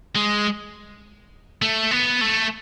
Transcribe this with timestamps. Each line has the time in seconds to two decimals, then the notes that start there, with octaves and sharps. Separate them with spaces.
0.15 G#3
1.62 A3
1.91 B3
2.21 A3